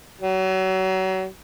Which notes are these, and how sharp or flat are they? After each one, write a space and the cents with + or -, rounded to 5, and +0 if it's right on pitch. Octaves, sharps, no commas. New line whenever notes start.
F#3 +30